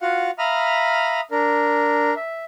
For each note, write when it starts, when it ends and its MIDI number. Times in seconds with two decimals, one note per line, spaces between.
0.01 0.31 65
0.01 0.31 66
0.01 0.31 77
0.01 0.31 78
0.39 1.21 76
0.39 1.21 77
0.39 1.21 82
0.39 1.21 83
0.39 1.21 87
0.39 1.21 89
1.31 2.14 62
1.31 2.14 70
2.16 2.45 76